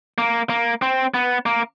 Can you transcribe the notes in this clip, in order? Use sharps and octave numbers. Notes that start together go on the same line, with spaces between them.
A#3
A#3
C4
B3
A#3